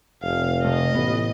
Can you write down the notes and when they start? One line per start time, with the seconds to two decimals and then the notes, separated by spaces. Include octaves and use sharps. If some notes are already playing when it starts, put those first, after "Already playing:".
0.23 F1 F5
0.65 C3 A3 D#5
0.95 A1 B3